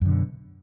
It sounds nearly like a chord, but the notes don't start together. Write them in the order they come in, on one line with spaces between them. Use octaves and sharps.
F#2 D3 B2